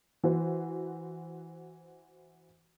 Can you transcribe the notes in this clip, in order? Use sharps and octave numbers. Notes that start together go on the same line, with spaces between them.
E3 F#4 C5